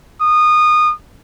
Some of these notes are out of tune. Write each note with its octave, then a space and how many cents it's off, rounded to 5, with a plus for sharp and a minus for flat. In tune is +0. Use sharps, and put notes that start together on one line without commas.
D#6 -25